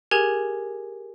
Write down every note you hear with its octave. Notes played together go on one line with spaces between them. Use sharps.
G4 G#4 A#4 G#5 G#6 F7